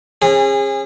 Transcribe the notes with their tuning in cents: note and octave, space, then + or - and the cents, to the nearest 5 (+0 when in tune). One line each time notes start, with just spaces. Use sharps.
C#4 -40 G#4 -25